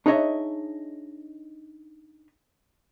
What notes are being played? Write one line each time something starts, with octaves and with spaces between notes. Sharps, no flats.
D4 D#4 G#4 C#5 D#5 E5